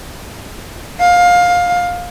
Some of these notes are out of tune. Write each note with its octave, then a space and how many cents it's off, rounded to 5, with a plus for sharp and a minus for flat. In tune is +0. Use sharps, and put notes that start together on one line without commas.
F5 +20